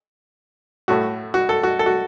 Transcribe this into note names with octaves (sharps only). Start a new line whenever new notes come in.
A2 A3 F#4
F#4
A4
F#4
A4
F#4